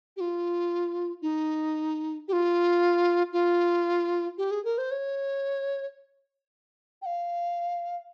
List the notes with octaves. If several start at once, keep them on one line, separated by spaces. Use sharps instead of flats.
G4
F4
D#4
G4
F4
F4
G4
G#4
A#4
C5
C#5
G5
F5